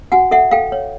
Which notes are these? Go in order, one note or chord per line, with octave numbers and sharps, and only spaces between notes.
F#4 F#5 G#5
A4 E5 F#5
A4 F5 G5
C#5